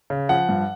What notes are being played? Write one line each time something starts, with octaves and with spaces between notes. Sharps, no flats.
C#3
F3 F#5
G2